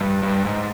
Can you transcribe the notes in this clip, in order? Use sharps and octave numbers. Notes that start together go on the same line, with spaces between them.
G2
G2
G#2